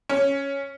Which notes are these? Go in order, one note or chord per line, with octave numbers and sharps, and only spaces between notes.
C#4